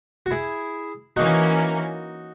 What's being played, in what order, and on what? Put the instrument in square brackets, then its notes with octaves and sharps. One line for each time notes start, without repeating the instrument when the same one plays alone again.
[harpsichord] F#4
E4 G#4
[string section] E3 A#3 C#4 [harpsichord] D#4 F#4